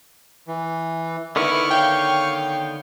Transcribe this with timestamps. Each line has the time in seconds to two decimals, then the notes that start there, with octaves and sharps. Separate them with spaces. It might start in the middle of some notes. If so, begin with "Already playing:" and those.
0.47 E3
1.36 D3 D#3 B3 E4 B4 C#6 F6
1.71 C#5 F5 G5